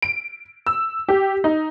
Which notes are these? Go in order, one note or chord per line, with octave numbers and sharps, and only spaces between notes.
D7
E6
G4
D#4